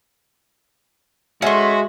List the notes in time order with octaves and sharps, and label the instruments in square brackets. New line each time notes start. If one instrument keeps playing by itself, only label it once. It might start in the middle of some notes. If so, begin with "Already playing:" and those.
[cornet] G#3 [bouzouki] A3 C#4 [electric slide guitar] F#4 [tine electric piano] E5 C6